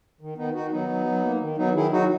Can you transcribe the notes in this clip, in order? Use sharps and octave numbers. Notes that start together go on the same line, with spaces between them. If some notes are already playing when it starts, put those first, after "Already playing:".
D#3
D#3 B3 D#4
D#3 D#4 F#4
F#3 B3 D#4
F#3
F#3
A#3
D#3
F#3 B3 D#4
D#3 E4 G#4
F#3 D#4 F#4